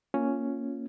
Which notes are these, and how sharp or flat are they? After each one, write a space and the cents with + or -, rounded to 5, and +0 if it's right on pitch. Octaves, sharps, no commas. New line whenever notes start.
A#3 +0 C#4 +0 F4 +0